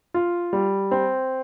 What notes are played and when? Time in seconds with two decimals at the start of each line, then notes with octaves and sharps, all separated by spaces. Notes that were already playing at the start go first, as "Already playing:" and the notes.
0.14 F4
0.53 G3
0.91 C4